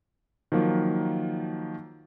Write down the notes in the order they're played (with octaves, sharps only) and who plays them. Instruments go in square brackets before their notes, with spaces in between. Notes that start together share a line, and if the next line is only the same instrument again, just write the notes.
[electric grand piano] D#3 F3 F#3 A#3